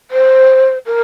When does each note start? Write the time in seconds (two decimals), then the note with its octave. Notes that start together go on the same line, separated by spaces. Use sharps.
0.11 C5
0.86 A#4